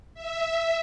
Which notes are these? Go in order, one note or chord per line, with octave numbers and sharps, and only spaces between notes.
E5